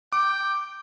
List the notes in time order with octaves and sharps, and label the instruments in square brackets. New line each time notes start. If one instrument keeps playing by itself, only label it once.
[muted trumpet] G5 [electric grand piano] D6